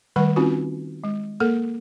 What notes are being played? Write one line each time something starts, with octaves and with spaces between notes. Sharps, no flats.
D#3 G3 A3 B4 F#5 C#6
C4 C#4 D#4 F4 F#4
G#3
A#3 A4 A#4